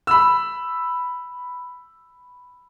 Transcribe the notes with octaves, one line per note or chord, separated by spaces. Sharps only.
B5 E6